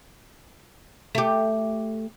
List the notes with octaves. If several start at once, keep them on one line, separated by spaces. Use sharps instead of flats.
A3 G4